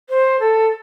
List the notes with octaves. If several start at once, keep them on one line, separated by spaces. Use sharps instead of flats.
C5
A4